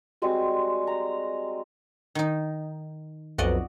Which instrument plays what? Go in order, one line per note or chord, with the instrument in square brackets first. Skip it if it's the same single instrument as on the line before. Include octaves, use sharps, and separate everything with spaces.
[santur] G3 G#3 C4 F#4
A#5
[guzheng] D#3 D#4
[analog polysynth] B1 F2 [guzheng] F#4 D5 D#5